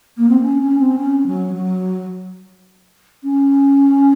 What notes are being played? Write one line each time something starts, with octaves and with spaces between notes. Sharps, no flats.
A#3
C4
C#4
C#4
C4
C#4
F#3
F#3
C#4